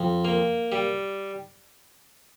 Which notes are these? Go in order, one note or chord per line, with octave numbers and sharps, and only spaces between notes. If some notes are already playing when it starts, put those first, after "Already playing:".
Already playing: F2
A#3
G3